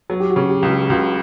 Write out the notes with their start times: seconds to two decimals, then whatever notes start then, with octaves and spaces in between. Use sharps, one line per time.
0.10 F#3
0.20 G4
0.29 F#4
0.36 C#3
0.49 G4
0.62 C#2
0.70 G4
0.90 C#2 F#4